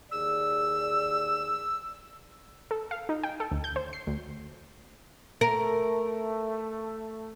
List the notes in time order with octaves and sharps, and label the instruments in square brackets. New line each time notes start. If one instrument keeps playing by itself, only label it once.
[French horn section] D#2 G#4 D5 [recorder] E6
[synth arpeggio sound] A4
F5
D#4
G5
A4
D2
G6
C5
C7
D2
[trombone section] A3 [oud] A#4